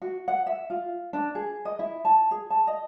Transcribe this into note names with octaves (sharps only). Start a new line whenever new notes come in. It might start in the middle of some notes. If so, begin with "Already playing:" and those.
F#4
F#5
E5
F4
D4
G#4
D#5
E4
A5
G#4
A5
D#5